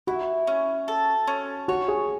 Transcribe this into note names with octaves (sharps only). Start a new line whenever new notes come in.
E4 F#4
C#4
A4
C#4
F#4 C#5
G#4